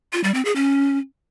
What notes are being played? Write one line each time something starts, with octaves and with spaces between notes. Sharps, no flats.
F4
G3
C4
G#4
C#4